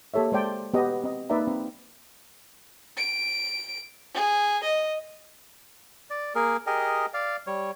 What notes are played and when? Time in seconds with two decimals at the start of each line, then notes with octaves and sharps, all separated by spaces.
0.14 A#3 G4 A4 C#5 E5
0.32 G#3 C5 D5 G5 A5
0.74 B3 G4 D#5
1.04 C4 D#5
1.30 A#3 D#4 B4 D5 E5 A#5
1.48 C4
2.97 D7
4.14 G#4
4.63 D#5
6.10 D5
6.35 A#3 G#4 A#4
6.67 G4 G#4 A#4 D#5
7.14 D5 F5
7.47 G3 C#5